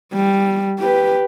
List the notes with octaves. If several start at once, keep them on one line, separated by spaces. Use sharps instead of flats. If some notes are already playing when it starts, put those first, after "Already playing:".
G3
G4 B4